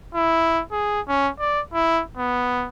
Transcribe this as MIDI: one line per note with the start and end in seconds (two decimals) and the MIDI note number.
0.15 0.62 64
0.72 1.01 68
1.08 1.29 61
1.40 1.61 74
1.74 2.03 64
2.17 2.68 59